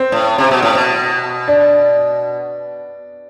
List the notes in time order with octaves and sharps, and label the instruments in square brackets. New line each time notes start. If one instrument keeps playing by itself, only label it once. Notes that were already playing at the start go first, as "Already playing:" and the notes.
Already playing: [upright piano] C4
[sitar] A2
C3
B2
A2
B2
[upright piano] D4